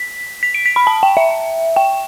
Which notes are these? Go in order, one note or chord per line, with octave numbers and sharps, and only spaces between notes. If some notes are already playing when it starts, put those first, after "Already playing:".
Already playing: B6
B6
D7
B6
B5
A5
G5
E5
G5